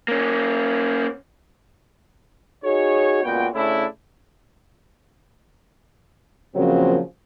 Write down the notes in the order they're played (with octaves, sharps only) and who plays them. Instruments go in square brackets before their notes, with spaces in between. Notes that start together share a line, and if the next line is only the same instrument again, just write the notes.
[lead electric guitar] A#3 C#4
[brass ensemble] D#4 F#4 G#4 C#5
C#2 A#2 B3 F#4 G5
C#3 A3 C#4 D4 E4
[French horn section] F#2 A#2 C#3 F3 F#3 C4